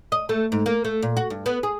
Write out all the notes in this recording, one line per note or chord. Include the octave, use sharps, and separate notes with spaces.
D#5
A3
G#2
A#3
A3
A#2
F#4
G2
B3
G#4